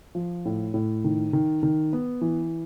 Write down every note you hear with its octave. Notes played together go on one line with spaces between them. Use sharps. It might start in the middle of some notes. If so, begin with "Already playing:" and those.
F3
A2
A2
D#3
D#3
D#3
B3
E3